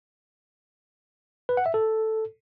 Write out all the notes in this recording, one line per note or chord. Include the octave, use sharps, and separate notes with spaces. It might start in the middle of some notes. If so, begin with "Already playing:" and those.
B4
F#5
E5
A4